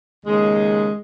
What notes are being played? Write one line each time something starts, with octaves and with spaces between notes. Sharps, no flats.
D#2 C#3 G#3